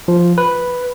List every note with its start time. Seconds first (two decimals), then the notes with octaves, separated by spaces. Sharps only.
0.08 F3
0.38 B4